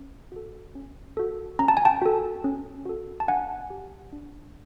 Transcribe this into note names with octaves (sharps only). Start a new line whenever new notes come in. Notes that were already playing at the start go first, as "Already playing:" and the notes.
Already playing: C#4
F#4 A4
C#4
F#4 A4
C#4 A#5
A5
G#5
G5 A5
F#4 A4
C#4
F#4 A4
A5
D4 F#5 G#5
G4
D4